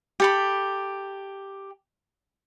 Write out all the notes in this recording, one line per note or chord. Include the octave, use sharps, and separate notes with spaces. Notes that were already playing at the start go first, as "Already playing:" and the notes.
G4 A4 B5